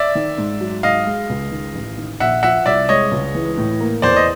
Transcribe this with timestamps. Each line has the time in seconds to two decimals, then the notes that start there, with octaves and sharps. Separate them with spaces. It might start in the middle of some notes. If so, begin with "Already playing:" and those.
Already playing: D5 E5
0.15 D#3
0.38 G#2
0.60 F#3
0.83 G#2 D#5 F5
1.06 G#3
1.29 C#2
1.51 D#3
1.74 A1
1.98 D#3
2.20 A#1 E5 F#5
2.43 F3 E5 F#5
2.66 C2 D5 E5
2.89 G#3 C#5 D#5
3.11 C#2
3.35 E3
3.57 A2
3.80 A#3
4.02 E2 C5 D5
4.16 D#5